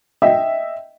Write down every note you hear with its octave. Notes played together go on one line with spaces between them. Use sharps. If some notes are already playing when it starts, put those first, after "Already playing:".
D#5 E5 G5